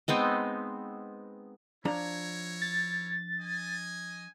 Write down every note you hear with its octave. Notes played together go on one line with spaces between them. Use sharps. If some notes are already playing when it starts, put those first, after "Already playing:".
G#3 B3 C4 D#4
F3 D4 E4 A#4 C#5 A#5
A6
D#5 G#5